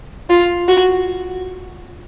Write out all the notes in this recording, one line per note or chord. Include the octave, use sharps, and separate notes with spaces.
F4
F#4